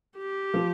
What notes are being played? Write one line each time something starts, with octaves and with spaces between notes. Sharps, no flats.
G4
F3